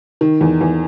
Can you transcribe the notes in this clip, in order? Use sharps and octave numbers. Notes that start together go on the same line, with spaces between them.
D#3
E2
E2